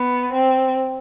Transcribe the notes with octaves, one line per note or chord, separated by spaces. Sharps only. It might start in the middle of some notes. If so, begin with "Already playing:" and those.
Already playing: B3
C4